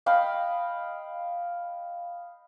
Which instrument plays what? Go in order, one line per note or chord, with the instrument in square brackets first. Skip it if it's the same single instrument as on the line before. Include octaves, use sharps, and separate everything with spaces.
[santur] D#5 F5 G5 B5